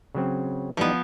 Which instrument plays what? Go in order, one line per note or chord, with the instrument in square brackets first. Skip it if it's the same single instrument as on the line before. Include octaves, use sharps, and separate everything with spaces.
[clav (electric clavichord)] C#3 F#3 C4
[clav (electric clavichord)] E3 G3 D#4 [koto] F3 B3